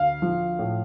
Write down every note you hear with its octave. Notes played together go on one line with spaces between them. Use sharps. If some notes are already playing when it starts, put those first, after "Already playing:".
Already playing: D2 F5
F3
A2